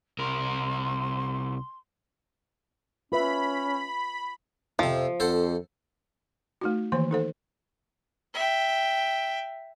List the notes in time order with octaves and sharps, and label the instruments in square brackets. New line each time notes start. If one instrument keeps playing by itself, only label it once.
[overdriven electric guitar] C2 A#4 [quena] C6
[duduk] C#4 [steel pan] F4 B4 E5 [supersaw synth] B5
[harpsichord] F2 C3 [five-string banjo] F3
[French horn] F2 [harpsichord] A4 C5 F#5
[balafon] A3 D#4 F#4
D#3 E3 A#3 C5
D#4 A4 C5
[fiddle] E5 G5